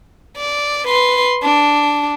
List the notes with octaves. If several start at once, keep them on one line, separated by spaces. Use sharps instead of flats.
D5
B4 C6
D4